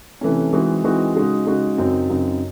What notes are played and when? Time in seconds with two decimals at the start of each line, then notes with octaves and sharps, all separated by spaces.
0.21 C3 E3 A3 C#4
0.53 E3 G#3 C4 D#4 F#4
0.84 E3 G#3 C4 D#4 F#4
1.15 C#3 G#3 D#4 F#4
1.47 C#3 G#3 D#4 F#4
1.78 F#2 C#3 F#3 C4 D#4
2.10 F#2 C#3 F#3 C4 D#4